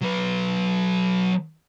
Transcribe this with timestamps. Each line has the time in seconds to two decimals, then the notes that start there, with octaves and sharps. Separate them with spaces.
0.01 F#3 B4